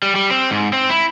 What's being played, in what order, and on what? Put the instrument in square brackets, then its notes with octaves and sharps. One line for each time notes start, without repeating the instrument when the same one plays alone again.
[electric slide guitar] G3
G3
C4
G#2
C4
E4